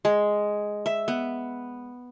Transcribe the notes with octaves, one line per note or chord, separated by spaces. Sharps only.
G#3
E5
B3